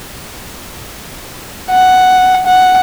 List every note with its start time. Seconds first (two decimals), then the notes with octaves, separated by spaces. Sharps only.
1.71 F#5
2.47 F#5